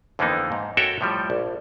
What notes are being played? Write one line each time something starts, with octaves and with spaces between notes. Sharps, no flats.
F2 D3 E3 A#3 B3 D#4
G#2
F#4 A4 A#4 C#5 E5 G5
A2 F3 G3
A#1